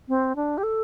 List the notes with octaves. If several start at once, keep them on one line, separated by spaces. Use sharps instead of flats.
C4
D4
G4
A4